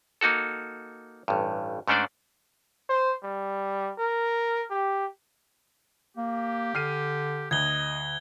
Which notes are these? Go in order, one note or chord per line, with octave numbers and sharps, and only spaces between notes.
A#3 D#4 F#4 A4
A1 G2
G#2 A3 C#4 D4 C5 D5
C5
G3
A#4
G4
A#3 G4
D3 F6 C7 D#7
D2 D#5 G#6 G7